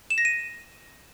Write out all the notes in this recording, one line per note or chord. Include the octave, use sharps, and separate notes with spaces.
E7
A#6
D#7